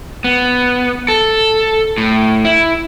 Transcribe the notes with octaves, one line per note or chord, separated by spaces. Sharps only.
B3
A4
A2
E4